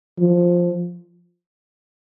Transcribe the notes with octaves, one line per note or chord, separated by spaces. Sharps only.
F3